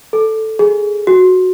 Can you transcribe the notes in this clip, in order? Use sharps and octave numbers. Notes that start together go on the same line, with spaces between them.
A4
G#4
F#4